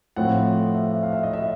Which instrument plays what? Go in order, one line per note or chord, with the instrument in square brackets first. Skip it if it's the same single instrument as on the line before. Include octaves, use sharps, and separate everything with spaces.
[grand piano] A2 F3 A3 C4 F#5
E5
F5
E5
D#5
E5